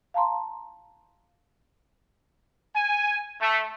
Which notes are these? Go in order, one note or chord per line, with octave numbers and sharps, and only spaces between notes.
F5 A5 A#5 C6
G#5
A3